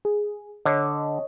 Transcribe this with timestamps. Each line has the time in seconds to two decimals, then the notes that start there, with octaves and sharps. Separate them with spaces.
0.05 G#4
0.66 D3 C#5 D#5